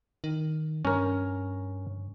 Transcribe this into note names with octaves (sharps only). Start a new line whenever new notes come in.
D#3
G2 C#4 A#4